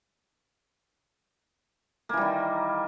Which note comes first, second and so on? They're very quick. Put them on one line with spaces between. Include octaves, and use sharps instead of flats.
A#3 E3 G3 D#3